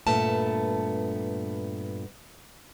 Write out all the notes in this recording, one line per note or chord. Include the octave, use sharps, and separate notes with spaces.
G2 A#2 A3 B3 A5